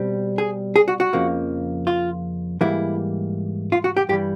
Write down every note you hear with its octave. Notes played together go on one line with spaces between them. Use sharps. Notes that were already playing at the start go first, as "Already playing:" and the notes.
Already playing: B2 G3 C4
G#4
G#4
F#4
F#4
F2 C#3 F3 A#3
F4
G#2 E3 G3 A#3 E4
F4
F#4
G4
G2 E3 G3 G4